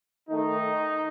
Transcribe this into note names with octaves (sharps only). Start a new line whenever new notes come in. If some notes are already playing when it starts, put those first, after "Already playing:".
D#3 A3 D#4